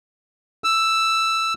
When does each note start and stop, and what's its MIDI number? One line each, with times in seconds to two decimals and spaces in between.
0.64 1.54 88